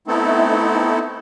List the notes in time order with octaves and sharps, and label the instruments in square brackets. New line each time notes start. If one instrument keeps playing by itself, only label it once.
[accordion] A3 B3 C4 D#4 E4 A4